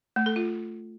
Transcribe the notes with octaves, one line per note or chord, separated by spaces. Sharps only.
A3
A4
F4